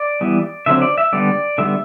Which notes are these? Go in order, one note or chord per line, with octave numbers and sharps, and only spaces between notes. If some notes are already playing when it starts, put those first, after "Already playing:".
Already playing: D5
E3 G3 B3
D3 F#3 C4 E5
D5
E5
D3 G3 B3 D5
D3 G3 B3 E5